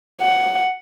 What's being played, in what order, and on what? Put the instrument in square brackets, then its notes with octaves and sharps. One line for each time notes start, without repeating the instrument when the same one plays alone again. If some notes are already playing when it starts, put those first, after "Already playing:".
[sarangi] F#5